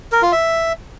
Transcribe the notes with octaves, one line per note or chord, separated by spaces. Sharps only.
A#4
F4
E5